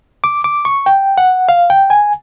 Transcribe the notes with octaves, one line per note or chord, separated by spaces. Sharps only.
D6
D6
C#6
G5
F#5
F5
G5
G#5